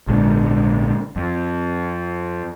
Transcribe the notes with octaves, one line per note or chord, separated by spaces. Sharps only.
A#1 G#2 B2 D3
F2